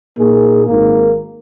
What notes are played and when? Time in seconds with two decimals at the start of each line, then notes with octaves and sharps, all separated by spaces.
0.18 A#2 A#3 D#4 G#4
0.67 G#1 G#2 D#3 A#3